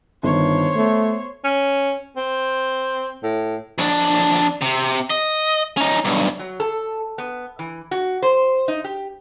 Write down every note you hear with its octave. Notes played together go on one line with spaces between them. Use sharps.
G1 D#3 C5 C#5
A3 B3
C#4
C4
A2
F2 D4
C3
D#5
C#4 D#4
B1 G2
F#3
A4
B3
E3
F#4
C5
D#4
G4